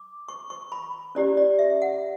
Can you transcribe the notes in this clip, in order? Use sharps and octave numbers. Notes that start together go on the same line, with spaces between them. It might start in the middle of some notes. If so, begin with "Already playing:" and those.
Already playing: D6
C#6
C#6
B5
C#4 E4 G4 D5
D5
E5
F#5